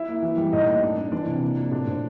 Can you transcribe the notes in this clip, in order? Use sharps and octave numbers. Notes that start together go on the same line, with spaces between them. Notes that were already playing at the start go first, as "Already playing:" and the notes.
Already playing: E4 E5
A#3
E3
G3
A2 D#4 D#5
A#3
D4
D4
E3 D4 D5
C3
A#3
F3
A2 D4 D5
A2 C5